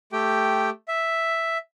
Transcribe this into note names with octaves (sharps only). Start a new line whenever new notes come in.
A3 G4 G5
E5